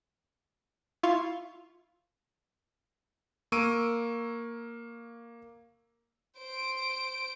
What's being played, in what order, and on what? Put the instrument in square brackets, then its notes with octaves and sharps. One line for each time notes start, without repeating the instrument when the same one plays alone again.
[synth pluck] E4 F4 F5 C6 C#6
[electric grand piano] A#3 C#6 E6 D7 D#7
[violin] C5 D7